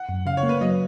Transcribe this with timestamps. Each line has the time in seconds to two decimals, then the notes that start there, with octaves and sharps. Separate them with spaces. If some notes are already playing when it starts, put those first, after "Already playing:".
Already playing: F#5
0.09 F#2
0.26 C#3 F5
0.37 C#5
0.43 A#3
0.49 B4
0.61 F#3 D#5